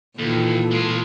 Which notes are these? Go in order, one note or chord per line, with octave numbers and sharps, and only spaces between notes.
D#2 A#2 E3 A4
G#3 F4